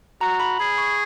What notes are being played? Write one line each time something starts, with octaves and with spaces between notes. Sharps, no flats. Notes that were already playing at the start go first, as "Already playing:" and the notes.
F#4 A#5
B5
G#4 B5
C#6